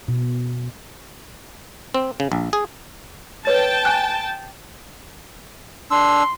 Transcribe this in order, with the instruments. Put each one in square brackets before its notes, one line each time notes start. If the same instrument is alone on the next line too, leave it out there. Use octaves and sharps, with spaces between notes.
[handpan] B2
[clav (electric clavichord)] C4
C#3
A#1
G#4
[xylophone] B4 C#5 A6 [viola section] G5 A5
[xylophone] G#5 F#6
[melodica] D4 E6 [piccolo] C6